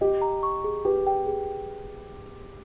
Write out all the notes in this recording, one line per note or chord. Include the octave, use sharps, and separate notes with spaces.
G4 D#5
A#5
C#6
G#4
G4 B4
G5
G#4